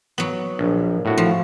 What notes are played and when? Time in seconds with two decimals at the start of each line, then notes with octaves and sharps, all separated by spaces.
0.18 F#3 B3
0.59 A#1
1.05 A2 F#4
1.18 F3